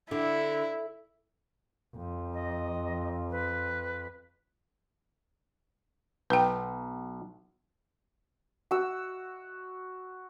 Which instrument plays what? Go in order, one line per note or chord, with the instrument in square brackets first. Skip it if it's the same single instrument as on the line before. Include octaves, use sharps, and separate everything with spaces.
[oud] D3 [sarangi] E4
[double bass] F2
[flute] D#5
B4
[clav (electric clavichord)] B1 [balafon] B4 G5
[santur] F#4 E6